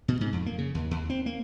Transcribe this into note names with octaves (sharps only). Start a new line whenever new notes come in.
B2
G#2
F2
A#3
C#3
D#2
D#2
C4
A#3